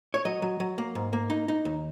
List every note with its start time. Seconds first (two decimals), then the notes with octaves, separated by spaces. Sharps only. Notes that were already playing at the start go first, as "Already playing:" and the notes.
0.14 C#5
0.25 F#3 D#5
0.42 F#3
0.60 F#3
0.78 A#3
0.95 G#2
1.13 A#3
1.30 D#4
1.48 D#4
1.65 D#2